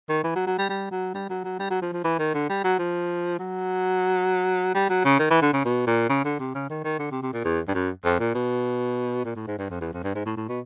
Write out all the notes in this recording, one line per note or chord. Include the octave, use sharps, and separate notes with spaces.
D#3
E3
F#3
F#3
G3
G3
F#3
G3
F#3
F#3
G3
F#3
F3
F3
E3
D#3
D3
G3
F#3
F3
F#3
G3
F#3
C#3
D#3
E3
D3
C#3
B2
A#2
C#3
D3
C3
C#3
D#3
D#3
D3
C3
C3
A#2
E2
G2
F#2
F2
A#2
B2
A#2
A2
G#2
G2
F2
E2
F2
G2
G#2
A2
A2
B2